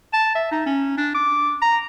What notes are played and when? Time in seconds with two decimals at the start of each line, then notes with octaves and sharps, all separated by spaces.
0.13 A5
0.35 E5
0.52 D#4
0.66 C#4
0.98 D4
1.15 D6
1.62 A#5